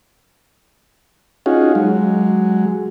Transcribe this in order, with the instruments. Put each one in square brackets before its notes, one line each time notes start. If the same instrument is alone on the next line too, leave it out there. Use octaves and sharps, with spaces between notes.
[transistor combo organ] C#4 D#4 F4 F#4 G#4
F#3 G#3